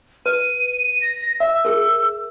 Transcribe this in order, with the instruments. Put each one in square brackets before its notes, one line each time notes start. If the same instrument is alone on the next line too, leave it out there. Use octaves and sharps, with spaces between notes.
[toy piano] B4 [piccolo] D#7
[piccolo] A#6
[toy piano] E5 [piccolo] E6
[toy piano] G#4 A#4